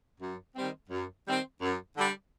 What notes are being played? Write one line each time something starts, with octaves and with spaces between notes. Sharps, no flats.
F#2
D#3 G3 C4
F#2
D#3 G3 C4
F#2
D3 G3